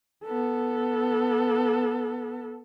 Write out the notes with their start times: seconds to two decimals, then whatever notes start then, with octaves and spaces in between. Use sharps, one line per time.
0.25 B3 A4